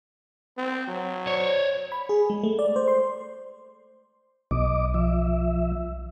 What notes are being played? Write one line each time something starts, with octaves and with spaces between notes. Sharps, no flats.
C4
F#3
C5 C#5
B5
G#4
G#3
A3
D5
C5
C6
B1 D#5 D6
F3 E5